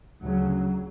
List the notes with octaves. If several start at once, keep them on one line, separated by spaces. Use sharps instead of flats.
D2 C#3 F#3